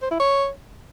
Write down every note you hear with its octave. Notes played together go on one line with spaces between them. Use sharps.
C5
E4
C#5